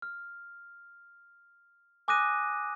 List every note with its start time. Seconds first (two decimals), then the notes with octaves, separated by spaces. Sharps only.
0.02 F6
2.08 G#5 D6 D#6 F#6 A#6 D#7